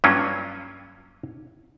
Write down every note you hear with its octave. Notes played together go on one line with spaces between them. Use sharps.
G2 F#3 A#3 C#4 F4